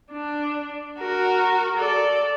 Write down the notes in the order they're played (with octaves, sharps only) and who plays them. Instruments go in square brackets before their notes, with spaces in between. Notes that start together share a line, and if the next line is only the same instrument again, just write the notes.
[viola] D4
F#4 A#4
A4 D5